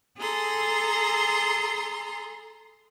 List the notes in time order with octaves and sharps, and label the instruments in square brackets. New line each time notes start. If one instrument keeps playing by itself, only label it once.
[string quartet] G#4 A4 A#5 C6